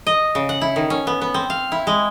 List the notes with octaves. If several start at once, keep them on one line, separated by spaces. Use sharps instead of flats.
D#5
C#3
F#5
E4
D#3
C#4
B3
B3
C4
F5
E4
G#3